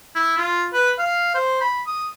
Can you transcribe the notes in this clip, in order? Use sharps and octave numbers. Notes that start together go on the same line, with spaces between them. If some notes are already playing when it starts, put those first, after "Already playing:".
E4
F4
B4
F5
C5
B5
D#6